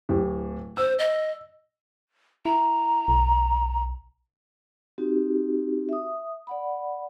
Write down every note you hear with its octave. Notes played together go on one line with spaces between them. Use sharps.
D1 A2 G4
C5 E6
D#5
E4 A#5
B1
C4 D#4 F#4 G4
E5 D#6
D5 F#5 B5